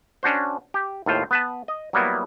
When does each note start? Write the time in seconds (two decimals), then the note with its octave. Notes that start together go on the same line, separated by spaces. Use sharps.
0.23 C#4 D4 F#4 C5
0.74 G4
1.06 D#2 A2 F4 C5
1.31 B3 B4 A5
1.68 D#5
1.93 F#3 G3 A#3 B3 E4